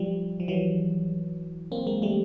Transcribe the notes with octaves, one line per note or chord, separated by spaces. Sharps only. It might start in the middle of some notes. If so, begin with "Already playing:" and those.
Already playing: F3 G3
F3
E3 F#3
A#3 C4
G#3 A#3
G3 A3